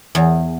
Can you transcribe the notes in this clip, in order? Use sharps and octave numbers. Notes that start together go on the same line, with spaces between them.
E2